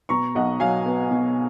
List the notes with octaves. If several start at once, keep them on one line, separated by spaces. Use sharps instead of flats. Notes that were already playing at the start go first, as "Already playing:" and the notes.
B2 A#5 C#6
B1 D#5 F#5
F#3 F5 G#5
B3
B2